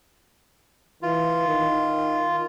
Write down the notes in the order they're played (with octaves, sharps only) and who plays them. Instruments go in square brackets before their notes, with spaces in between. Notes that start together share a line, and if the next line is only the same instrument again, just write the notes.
[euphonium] E3 [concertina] F4
[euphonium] D#3